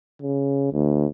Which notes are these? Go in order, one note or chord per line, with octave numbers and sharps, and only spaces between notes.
C#3
D2